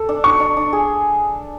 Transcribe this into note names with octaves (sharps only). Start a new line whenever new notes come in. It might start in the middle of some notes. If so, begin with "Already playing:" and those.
Already playing: A4
D4
D4 C#6
D4
D4
G#4